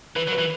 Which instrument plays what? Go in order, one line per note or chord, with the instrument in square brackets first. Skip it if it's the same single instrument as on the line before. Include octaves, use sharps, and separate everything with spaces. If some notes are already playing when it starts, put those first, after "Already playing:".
[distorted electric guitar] E3 [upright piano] B4
[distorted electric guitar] F#3
[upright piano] B4
[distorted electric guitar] E3